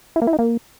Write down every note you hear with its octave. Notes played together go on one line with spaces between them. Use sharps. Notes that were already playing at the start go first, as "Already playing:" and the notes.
E4
A#3
E4
D#4
A#3